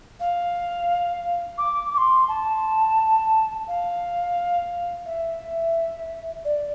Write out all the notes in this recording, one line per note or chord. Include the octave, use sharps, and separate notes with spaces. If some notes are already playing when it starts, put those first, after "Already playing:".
F5
D6
D6
C6
A5
F5
E5
D5